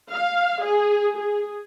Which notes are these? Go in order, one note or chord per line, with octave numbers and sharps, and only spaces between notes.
F5
G#4
G#4